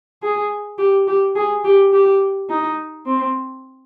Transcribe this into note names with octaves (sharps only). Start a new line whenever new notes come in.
G#4
G4
G4
G#4
G4
G4
D#4
C4